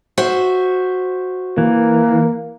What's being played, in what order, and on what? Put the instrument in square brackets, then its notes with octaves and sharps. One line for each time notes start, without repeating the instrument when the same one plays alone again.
[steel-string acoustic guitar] F#4 C5 E5
[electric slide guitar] E3 [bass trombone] A#3